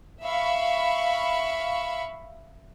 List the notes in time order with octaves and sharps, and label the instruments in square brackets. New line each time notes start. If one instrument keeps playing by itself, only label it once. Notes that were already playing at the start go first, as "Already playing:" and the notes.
[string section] E5 F5 B5 C#6